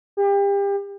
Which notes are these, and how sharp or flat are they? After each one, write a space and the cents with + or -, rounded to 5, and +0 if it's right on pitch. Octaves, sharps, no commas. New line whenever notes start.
G4 +30